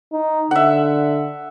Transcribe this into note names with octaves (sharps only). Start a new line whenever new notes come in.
D#4
D3 E5 F#5